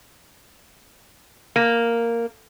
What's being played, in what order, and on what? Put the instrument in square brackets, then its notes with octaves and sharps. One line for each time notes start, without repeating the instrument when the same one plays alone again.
[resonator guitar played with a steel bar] A#3